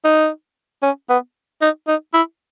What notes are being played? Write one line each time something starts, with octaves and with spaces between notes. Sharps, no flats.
D#4
C#4
B3
D#4
D#4
E4